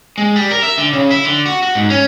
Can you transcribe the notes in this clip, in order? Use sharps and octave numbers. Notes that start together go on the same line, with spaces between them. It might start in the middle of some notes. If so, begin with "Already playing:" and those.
G#3
G3
A#4
E5
D3
C#3
E4
D3
F#4
F#4
G#2
C#4